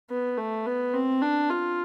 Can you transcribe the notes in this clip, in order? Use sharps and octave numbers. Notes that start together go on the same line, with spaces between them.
B3
A3
B3
C4
D4
F4